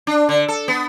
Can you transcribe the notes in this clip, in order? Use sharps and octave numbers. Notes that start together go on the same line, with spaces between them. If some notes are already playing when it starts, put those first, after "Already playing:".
D4
D3
A4
B3